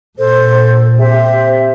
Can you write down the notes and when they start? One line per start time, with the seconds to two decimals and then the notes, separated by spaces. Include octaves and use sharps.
0.18 A#2 A4 C5
0.99 C4 G4 C5 E5